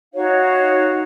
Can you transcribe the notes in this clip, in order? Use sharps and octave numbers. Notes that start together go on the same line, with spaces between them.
D#4 F#4 C#5 F5